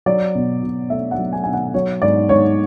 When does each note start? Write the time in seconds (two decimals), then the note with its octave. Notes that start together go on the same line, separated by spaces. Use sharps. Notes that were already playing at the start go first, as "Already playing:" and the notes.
0.06 F#3 D5
0.35 B2
0.63 B2
0.90 A3 E5
1.11 F#5
1.18 F#3
1.33 G#5
1.44 B2 G#5
1.53 F#5
1.74 F#3 C#5
2.02 G#2 D5
2.29 G#2 C#5